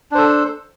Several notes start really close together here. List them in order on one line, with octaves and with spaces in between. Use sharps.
D4 C5 A4